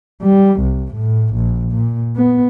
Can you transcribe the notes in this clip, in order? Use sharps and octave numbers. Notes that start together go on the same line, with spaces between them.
G3
C2
A2
A#1
A#2
B3